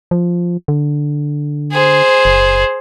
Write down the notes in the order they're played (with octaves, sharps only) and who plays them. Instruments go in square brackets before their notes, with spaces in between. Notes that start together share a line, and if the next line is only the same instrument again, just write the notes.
[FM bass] F3
D3
[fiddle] G#4 C5
[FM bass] F#1